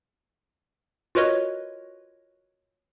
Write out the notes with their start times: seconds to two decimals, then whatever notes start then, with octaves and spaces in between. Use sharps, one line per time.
1.15 F4 F#4 A#4 B4 C#5 D#5